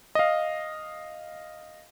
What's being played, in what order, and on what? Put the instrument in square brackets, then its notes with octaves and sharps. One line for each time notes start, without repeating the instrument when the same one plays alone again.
[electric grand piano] D#5 F5